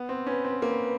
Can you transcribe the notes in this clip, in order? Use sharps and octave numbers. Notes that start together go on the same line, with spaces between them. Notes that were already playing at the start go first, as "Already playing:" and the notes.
Already playing: B3
C4
C#4 B4
C4
A#3 B4